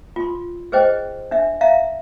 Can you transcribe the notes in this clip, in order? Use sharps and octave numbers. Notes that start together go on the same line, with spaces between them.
F4 C6
G#4 B4 C5 D#5 G5
D4 E5
E5 F5 A#5